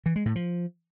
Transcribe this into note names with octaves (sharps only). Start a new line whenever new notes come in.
E3
G#3
A2
F3